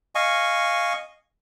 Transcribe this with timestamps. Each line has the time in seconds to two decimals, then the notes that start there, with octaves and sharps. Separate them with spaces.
0.15 D#5 F5 G#5 C#6